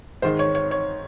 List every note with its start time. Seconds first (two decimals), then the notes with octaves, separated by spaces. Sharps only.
0.22 G#2 D#3 C5
0.39 C#5
0.55 C#5
0.71 C#5